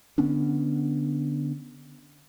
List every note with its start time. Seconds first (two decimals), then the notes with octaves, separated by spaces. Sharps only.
0.18 D3 B3 C#4 D4